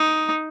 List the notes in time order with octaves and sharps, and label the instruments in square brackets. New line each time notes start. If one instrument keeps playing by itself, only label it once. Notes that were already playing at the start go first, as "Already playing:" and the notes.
Already playing: [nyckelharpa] D#4